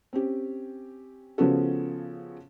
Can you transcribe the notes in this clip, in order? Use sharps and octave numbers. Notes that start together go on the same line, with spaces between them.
C4 C#4 G4
C#3 F3 B3 C#4 F#4 A4